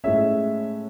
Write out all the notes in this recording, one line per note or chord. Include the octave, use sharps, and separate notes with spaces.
A2 G#3 C#4 E5